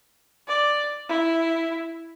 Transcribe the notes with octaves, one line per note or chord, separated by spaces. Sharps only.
D5
E4